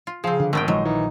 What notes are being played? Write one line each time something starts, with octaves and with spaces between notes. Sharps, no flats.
F4
C#3 F3 C4 G#4 F5
D3
G#1 D#3 A3 B3 G5
A#1 D#3 F3 F#3 G#3 D#5
E3 D#4